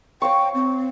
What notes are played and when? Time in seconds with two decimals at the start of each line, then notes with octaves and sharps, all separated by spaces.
0.22 C#5 F5 G5 C#6
0.54 C4